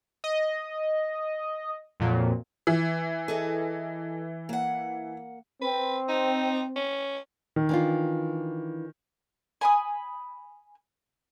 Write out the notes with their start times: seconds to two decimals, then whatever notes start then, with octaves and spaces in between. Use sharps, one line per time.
0.24 D#5
2.00 F2 A#2 F#3
2.67 E3
3.28 G#4 A4 D#5
4.49 A#3 F#5
5.62 C4 B4
6.09 D#4
6.76 C#4
7.56 D#3
7.69 E3 D4 F4
9.61 G#5 B5 D#6